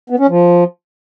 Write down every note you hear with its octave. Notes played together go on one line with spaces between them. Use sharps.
B3
C#4
F3